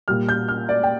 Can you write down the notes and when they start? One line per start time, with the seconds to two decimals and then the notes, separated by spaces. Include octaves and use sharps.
0.08 A#2 G3 F6
0.29 G6
0.48 F6
0.69 D5
0.84 G5